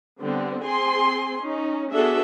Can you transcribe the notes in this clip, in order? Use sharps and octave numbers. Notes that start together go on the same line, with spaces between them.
D3 G3 B3 C4
C4 G#4 G#5 C6
C#4 D#4
B3 D4 F#4 G#4 A4 E5